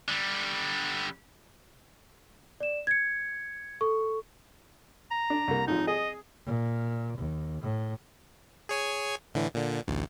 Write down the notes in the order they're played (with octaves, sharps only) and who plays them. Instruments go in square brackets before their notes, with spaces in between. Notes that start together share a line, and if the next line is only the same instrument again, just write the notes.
[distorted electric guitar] D3 G3
[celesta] D5 E7
G#6 C#7
A4 C#6
[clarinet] A#5
[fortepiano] D4
C2 A#3
[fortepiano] G#1 F3 [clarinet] D#4
[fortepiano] G#4 [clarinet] D#5
[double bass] A#2
D#2
A2
[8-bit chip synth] G#4 C#5 G#5
A2 D3 E3
A#2 D3
A1 D2